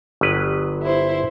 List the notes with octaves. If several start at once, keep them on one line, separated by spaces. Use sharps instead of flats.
G1 F#3 B4
E4 C5